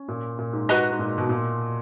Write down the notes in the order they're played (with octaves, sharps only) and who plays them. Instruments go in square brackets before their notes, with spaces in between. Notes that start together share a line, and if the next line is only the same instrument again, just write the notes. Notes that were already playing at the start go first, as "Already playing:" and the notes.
Already playing: [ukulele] C#4
[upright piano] A#2
A#2
G#2
[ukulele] F#4 B4 D#5 A#5
[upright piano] G#2
A#2
B2
A#2